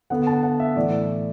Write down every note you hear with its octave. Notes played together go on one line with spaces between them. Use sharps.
D3 B3 F#5
A5
F#5
E5
A2 E3 D5